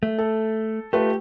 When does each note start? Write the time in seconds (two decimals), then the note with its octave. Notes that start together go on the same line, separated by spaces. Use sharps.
0.03 A3
0.18 A4
0.93 A3 F4 G4 B4